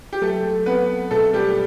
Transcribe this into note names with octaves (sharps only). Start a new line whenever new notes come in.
G4
F#3 A3 A4
B3 C4 B4
B2 A3 A4
G3 G4